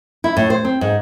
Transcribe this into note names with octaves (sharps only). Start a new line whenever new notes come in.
E4
A2
C5
C4
G#2